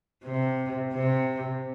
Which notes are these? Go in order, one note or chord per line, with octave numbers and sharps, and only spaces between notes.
C3
C3